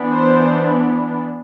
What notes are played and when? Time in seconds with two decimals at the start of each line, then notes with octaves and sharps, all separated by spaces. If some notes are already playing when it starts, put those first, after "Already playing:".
Already playing: E3 B3 D4
0.12 C5